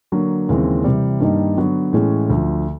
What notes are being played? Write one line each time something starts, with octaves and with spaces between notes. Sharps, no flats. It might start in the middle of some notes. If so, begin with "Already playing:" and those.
D3 F#3 A#3
D#2 C#3 E3 G#3 C4
C3 E3 G3
G2 D#3 G3 A#3 D#4
D3 F#3 B3
A2 E3 G#3 C#4
D2 D3 F3